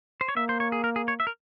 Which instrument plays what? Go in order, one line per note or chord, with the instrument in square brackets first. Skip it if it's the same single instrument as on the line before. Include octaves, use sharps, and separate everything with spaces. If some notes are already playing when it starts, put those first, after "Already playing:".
[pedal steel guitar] C5
C#5
[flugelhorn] A#3 [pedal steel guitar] E5
[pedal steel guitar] C5
C#5
G#4
A#4
G#4
C#5
E5
A#4